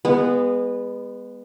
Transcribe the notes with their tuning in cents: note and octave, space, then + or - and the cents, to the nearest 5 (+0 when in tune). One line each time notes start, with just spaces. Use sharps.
G#3 -30 B3 +0